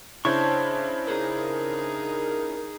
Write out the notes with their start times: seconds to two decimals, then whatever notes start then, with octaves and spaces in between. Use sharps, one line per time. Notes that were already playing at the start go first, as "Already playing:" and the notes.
0.25 C#3 D4 E4 C5 C#5 A5 C#6
1.07 D#4 G#4 A#4